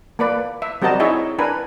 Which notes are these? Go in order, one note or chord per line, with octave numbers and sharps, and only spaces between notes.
A#3 B4 D5
E5
G3 C4 F#4 A#4 D#5 A5
D#4 E4 G#4 C#5 D#5 E5
D4 A#4 B4 G#5